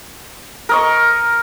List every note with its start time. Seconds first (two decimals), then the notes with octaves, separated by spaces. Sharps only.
0.69 A#4 D#5 C#6